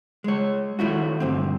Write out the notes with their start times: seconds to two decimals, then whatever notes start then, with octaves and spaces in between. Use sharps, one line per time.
0.24 G#3 C#5
0.79 D#3 A3 E4 F#4
1.20 D2 G2 C4